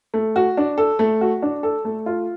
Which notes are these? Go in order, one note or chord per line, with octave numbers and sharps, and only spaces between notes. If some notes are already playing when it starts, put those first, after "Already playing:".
A3
F#4
D4
A4
A3
F#4
D4
A4
A3
F4